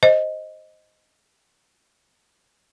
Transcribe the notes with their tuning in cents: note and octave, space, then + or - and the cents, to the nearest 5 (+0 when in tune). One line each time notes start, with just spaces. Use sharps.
C5 +0 D#5 +0